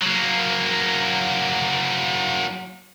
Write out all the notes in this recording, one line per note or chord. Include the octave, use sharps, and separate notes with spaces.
F#3 A#3